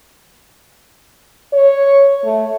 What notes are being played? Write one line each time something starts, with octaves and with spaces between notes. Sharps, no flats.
C#5
A3